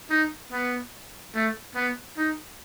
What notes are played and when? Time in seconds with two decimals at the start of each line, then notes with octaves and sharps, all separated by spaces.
0.10 D#4
0.51 B3
1.34 A3
1.75 B3
2.17 D#4